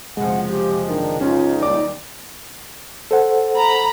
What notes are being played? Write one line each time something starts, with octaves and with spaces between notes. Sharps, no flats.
F#1 C3 F3 G#3 F#5
G4
D#3 D4
C#2 C#4 D#4 F4
D#2 G3 D5 D6
A4 C5 F#5
A#5 B5